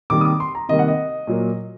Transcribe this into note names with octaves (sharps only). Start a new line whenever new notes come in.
C3 D#3 G3 A#3 D6
D#6
D6
C6
A#5
C3 D#3 G3 A#3 D#5
F#5
D#5
A#2 F#3 A#3